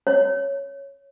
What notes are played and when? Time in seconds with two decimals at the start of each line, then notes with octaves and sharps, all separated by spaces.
0.07 C#5